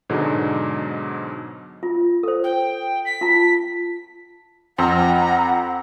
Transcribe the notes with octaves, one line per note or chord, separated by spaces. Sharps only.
G#2 B2 D3 F#3 G#3
F4
A4 C5
G5
B6
F4 A5
F2 C4 F#5 A#5